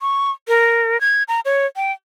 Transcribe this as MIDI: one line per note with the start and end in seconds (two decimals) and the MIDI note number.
0.01 0.31 85
0.48 1.00 70
1.01 1.23 92
1.28 1.40 82
1.45 1.66 73
1.76 1.92 79